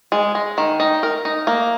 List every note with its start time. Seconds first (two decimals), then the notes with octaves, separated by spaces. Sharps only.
0.12 G#3
0.35 G#3
0.58 D#3
0.80 D#4
1.03 A#4
1.25 D#4
1.47 A#3